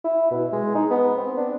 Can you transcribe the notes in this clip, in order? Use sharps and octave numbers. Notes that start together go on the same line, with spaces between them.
E4
B2
G#3
D#4
B3
C4
D4